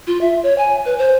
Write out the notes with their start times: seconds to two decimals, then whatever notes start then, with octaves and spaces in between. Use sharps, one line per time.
0.07 F4
0.21 E5
0.43 C#5
0.58 G#5
0.85 B4
0.99 C5